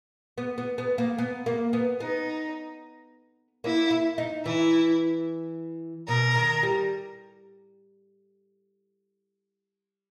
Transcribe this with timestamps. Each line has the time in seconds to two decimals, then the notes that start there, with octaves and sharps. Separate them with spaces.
0.38 B3
0.58 B3
0.78 B3
0.98 A#3
1.18 B3
1.46 A#3
1.73 B3
2.00 B3 D#4
3.64 A#3 E4
3.91 E4
4.18 D#4
4.45 E3 E4
6.08 B2 A#4
6.35 D#3
6.63 G3